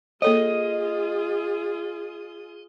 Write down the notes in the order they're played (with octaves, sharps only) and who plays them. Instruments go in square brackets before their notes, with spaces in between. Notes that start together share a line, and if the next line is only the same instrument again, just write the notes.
[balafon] A#3 A4 C#5 [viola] F4 G#4 [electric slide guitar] D#5